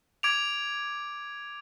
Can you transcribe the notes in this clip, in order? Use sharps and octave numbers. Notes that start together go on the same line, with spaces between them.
D6 G#6 D7 F7